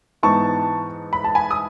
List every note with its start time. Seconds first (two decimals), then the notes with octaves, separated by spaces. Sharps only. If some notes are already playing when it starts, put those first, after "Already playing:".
0.23 G#2 E3 B3 D#4 A5 C#6
1.13 B5
1.24 A5
1.35 G#5 B5
1.51 D#6